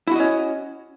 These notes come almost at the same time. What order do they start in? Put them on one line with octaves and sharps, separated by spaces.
E4 F#4 D#5 C#4